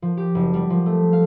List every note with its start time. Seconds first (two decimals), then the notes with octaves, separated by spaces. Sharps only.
0.02 F3
0.17 G4
0.35 F#1
0.54 G3
0.70 F3
0.86 A3
1.13 F5